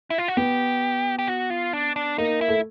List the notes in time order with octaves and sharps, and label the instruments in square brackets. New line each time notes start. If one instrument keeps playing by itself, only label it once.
[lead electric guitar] E4
F4
F#4
[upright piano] B3 [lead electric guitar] G4
[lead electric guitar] G4
F#4
F4
D4
D4
[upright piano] A#3 [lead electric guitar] D#4
[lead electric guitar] E4
[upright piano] A3